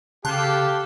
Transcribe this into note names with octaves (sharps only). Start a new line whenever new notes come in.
C#3 G4 A4 F5 A5 C6 F#6